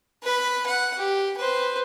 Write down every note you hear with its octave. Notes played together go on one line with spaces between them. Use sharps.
B4 B5
F#5
G4
B4 C5